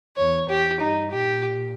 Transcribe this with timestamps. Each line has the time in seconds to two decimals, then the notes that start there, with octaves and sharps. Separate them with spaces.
0.17 E2 C#5
0.49 E2 G4
0.80 G2 D#4
1.11 A#2 G4